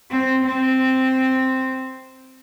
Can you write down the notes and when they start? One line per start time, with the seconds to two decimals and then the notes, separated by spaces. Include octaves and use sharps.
0.11 C4
0.45 C4